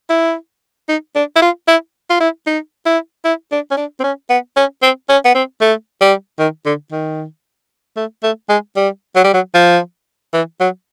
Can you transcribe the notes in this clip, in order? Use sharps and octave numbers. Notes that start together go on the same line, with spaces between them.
E4
D#4
D4
E4
F4
E4
F4
E4
D#4
E4
E4
D4
C#4
D4
C4
C#4
B3
C#4
C4
C#4
B3
C4
A3
G3
D#3
D3
D#3
A3
A3
G#3
G3
F#3
G3
F#3
F3
E3
F#3